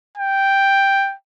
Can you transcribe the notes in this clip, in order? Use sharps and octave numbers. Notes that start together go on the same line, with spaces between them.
G5